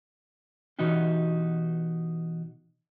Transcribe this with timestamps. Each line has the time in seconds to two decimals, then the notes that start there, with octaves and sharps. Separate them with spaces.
0.79 B2 E3 D#4 F#4 G4